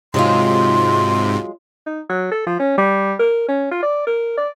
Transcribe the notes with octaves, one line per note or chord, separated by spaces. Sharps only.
G#2 C3 F#3 G#3 F4 C6
D#4
F#3
A4
F3
C#4
G3
A#4
C#4
F4
D5
A#4
D5